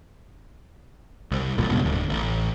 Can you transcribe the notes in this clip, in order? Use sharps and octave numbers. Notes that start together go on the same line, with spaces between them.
C2
D1 A1 A#2
C#2 G2 B2
D1 D2
A1